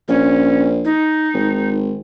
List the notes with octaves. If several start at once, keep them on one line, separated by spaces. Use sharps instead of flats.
A#1 C#4
D#4
G#1